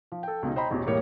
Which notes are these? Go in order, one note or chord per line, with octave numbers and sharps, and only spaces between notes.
F3
A4 G5
C#2 B2 D#4
C5 D#5 G5 A#5 B5
A1 E2 B2
E2 A2 G3 A#3 C#5